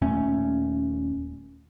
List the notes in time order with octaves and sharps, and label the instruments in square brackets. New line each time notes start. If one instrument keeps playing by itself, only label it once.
[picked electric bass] D#1 A#2 A3 C#4